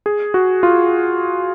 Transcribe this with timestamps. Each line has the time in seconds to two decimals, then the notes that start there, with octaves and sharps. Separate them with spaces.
0.06 G#4
0.34 F#4
0.63 F4